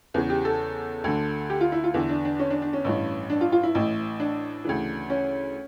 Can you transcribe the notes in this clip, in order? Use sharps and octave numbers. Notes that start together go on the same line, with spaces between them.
E2 C#3 E3
G4
A4
D2 D3
G4
F4
E4
F4
E2 D3 E4
D4
D4
C#4
D4
D4
C#4
A1 G2 E3
D4
F4
F4
E4
A1 A2 E3
D4
D2 C#3 E3
C#4